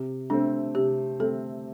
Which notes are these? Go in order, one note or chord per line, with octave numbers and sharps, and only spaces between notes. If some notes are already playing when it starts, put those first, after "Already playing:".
Already playing: C3
A3 C4 D4
C3 G4
A3 C4 A4